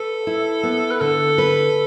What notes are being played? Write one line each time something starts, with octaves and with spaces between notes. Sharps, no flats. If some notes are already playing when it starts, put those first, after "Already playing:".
Already playing: A4 B4
E4
B3
B4
D3 A4
B4